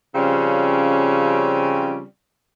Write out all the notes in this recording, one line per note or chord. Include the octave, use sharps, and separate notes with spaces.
C#3 F3 G3 C4 C#4